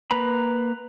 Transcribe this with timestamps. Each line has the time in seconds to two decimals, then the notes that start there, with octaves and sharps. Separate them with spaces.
0.11 A#3 B4 A#5 B5